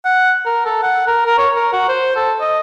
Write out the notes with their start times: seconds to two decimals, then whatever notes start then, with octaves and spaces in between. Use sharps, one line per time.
0.05 F#5
0.46 A#4
0.65 A4
0.83 F#5
1.07 A#4
1.26 A#4
1.38 C#5
1.55 A#4
1.73 F#4
1.88 C5
2.16 A4
2.40 D#5